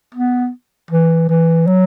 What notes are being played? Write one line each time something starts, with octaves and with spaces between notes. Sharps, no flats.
B3
E3
E3
F#3